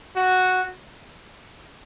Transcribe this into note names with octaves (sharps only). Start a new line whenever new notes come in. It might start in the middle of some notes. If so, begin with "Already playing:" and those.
F#4